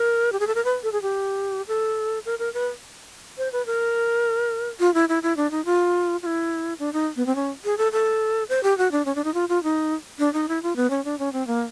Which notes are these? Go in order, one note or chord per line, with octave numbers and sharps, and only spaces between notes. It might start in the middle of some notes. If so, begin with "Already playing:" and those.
Already playing: A#4
G4
G#4
A4
A#4
B4
A4
G#4
G4
A4
A#4
A#4
B4
C5
B4
A#4
F4
E4
E4
E4
D4
D#4
F4
F4
E4
D4
D#4
B3
C4
C#4
G#4
A4
A4
C5
G4
F#4
D4
C#4
D4
D#4
F4
F4
D#4
D4
D#4
E4
F4
B3
C#4
D4
C#4
C4
A#3